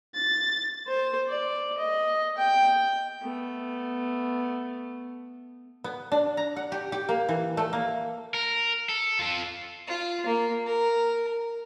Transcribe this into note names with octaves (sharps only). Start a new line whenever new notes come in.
A6
C5
D5
D#5
G5
A3 B3
B3
D4
A#5
F#5
G4
G4
A#3
E3
A3
A#3
A#4
A4
F4 A4
F4
A#3
A#4